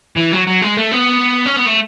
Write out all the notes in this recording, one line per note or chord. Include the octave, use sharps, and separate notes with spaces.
E3
F#3
F#3
G#3
A3
B3
C#4
B3
A3